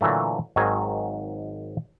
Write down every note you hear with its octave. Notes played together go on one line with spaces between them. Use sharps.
A#2 D3 E3 F#3 A3
G#1 G#2 D#3 F#3 G#5